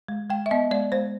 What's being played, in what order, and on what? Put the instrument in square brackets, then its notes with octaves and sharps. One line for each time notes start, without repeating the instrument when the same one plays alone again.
[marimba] G#3
G#3 G5
E5
B3 D#5
G#3 D5
G#3 C5